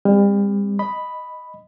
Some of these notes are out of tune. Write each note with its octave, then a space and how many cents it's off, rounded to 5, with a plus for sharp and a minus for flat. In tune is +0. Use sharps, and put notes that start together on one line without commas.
G3 +40 C4 +0
D#5 +0 B5 +0